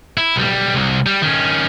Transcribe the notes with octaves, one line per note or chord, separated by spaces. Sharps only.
E4
B1 G3
C2
G3
D#3 C#4